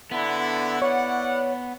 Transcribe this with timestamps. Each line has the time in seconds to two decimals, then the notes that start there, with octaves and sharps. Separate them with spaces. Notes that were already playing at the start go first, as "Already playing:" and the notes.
0.11 D3 B3 E4
0.82 E4 C#5 D5 F#5